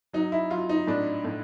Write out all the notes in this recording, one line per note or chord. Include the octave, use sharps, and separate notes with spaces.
F#3 D#4
E4
F#3 F4
D#4
A2 D4
A2